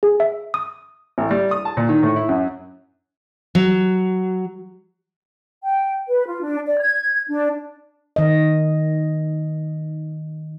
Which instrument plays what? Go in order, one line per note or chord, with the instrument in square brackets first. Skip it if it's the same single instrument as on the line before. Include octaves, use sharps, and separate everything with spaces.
[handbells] G#4
E5
D#6
[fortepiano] A1
G3
D#6
A5
A#2
D#3
A2
E4
F#2
[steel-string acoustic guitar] F#3
[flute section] G5
B4
F4
D4
D5
G#6
D4
[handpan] D#3 D#5